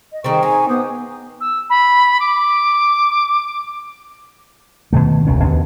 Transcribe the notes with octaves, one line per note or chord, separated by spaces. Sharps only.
D#5
D#3 G3 C4 G#4 A#5 C#6
D#4 G#5
B3 C5 D6 D#6
E6
B5
D6
B2 D#3 A3
E1 C#2 C#3 C#4
D#2 B2 D3